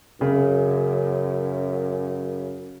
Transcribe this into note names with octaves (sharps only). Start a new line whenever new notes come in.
F#2 C#3